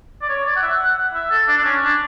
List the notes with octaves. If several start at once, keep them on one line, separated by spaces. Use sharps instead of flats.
D5
C#5
D5
F#5
E5
F#5
E5
A4
D4
D4
C#4
D4